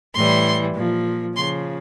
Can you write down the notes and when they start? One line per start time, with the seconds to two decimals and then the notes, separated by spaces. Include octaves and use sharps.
0.15 A2 E3 G3 C6
0.76 A#2 F3
1.36 C#3 F3 C6